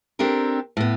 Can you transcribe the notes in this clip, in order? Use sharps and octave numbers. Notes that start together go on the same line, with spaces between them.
C4 D4 G4 A4 A#4
A2 B3